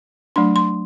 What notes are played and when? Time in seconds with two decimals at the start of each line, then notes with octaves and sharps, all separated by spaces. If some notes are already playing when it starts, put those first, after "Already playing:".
0.36 F#3 A3 D4 C6
0.56 C6